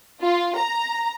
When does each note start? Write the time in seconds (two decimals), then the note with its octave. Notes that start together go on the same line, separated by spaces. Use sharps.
0.22 F4
0.58 A#5